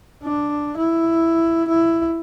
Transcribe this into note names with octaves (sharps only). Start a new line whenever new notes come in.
D4
E4
E4